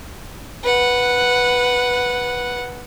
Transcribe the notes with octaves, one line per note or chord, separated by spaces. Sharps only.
B4 F#5